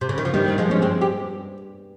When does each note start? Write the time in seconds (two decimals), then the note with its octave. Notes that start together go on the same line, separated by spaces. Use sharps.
0.01 C3
0.09 C#3
0.18 D#3
0.25 F3
0.33 G2 D#3 G3
0.58 F3 G#3
0.70 G2 C#4
0.82 G#3 C4
1.01 G4